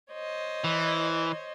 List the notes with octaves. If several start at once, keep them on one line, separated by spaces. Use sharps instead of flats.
C5 C#5 D#5
E3